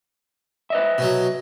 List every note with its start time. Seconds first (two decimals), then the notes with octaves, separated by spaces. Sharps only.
0.70 B4 D#5 E5
0.98 B2 F#3